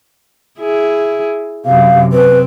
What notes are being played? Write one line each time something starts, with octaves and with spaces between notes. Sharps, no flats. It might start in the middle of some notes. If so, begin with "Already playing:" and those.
E4 G#4
F#2 C3 F5
C4 B4